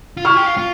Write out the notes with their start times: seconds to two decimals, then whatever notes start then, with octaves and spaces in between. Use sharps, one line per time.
0.17 F4
0.25 E4 C#6 F6
0.36 G4
0.46 F4
0.58 F4